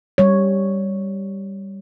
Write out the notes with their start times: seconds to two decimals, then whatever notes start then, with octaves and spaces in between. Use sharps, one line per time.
0.18 G3 C#5